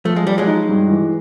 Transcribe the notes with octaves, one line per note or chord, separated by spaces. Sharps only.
F3 A3
G#3
F3 G3
F#3 G#3
D#4
G2
E3